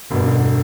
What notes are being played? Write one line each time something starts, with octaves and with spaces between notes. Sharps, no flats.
E1 G2 B2
D3